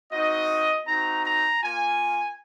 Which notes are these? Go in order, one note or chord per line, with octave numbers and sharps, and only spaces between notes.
C4 D#4 F#4 D#5
C4 D#4 F#4 A#5
A#5
A#3 F4 G#5